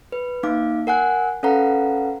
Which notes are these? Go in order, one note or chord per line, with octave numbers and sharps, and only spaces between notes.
B4
A#3 D#4 F5 D6
A#4 F#5 G#5 F#6
C#4 A4 B4 F5 F#5 A#5